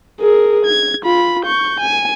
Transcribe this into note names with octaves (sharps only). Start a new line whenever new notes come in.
G#4 A#4
G#6
F4 B5
C#6 G6
G#5